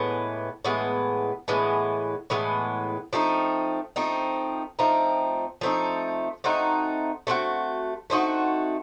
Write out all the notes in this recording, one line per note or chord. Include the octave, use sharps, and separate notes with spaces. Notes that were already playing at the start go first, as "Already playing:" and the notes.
Already playing: A2 E3 G#3 B3
A2 E3 G#3 B3
A2 E3 G#3 B3
A2 E3 G#3 B3
F3 A3 C4 D#4
F3 A3 C4 D#4
F3 A3 C4 D#4
F3 A3 C4 D#4
A3 C4 D#4 F#4
A3 C4 D#4 F#4
A3 C4 D#4 F#4